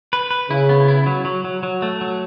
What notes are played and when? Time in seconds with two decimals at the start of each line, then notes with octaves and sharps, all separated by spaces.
0.13 B4
0.31 B4
0.50 C#3 E4
0.69 B3
0.88 E4
1.06 F#3
1.25 F#3
1.44 F#3
1.63 F#3
1.82 A3
2.01 F#3